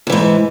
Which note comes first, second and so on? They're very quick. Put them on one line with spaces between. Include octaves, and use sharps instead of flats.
E2 E3 G#2